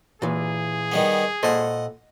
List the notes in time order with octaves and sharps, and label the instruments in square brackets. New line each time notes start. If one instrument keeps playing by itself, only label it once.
[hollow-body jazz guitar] A#2 E3 [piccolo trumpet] G#4
[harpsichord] D#3 G3 B3
[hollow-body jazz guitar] A#2 A4 C5 [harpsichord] D#5 F#5